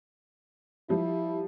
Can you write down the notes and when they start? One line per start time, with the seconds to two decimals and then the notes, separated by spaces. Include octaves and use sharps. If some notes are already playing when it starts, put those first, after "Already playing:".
0.89 F3 G3 E4